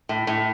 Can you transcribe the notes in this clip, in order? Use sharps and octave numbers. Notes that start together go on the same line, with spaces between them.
A2
A2